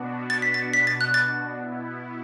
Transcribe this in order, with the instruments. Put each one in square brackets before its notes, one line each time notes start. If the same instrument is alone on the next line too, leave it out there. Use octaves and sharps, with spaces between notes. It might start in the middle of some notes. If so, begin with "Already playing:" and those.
Already playing: [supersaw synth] B2 B3 D4 F#4
[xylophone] A6
B6
A6
B6
A6
F#6
A6
[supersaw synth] B2 B3 E4